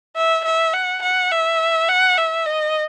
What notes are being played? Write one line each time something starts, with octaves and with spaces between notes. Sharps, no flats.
E5
E5
F#5
F#5
E5
F#5
E5
D#5